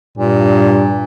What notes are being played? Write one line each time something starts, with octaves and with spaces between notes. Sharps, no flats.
G2 A#2